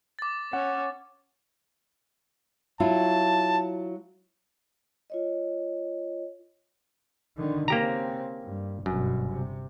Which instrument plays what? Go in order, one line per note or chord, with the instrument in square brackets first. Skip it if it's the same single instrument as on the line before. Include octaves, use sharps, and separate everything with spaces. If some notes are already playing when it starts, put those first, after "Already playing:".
[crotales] D6 A6
[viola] C#4 [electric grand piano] F#5
[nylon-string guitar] F#3 E4 F4 [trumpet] A5
[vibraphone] F4 C#5 D#5
[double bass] D3 D#3
[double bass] C#3 C4 [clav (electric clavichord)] A#3 G4 A#5
[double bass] G2
[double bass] G1 B2 [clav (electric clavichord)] F#2
[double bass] C3